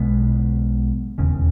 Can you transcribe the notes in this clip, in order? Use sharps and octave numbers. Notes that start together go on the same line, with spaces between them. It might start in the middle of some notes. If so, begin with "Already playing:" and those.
Already playing: B1 B2 G#3 B3
E1 D#2 C#3